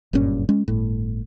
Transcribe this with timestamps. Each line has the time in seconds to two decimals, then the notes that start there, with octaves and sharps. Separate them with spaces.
0.13 F#1 G2 A#2 C#4
0.49 G#3 C#4
0.68 G1 A2